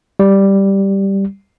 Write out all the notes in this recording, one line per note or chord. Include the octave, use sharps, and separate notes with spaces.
G3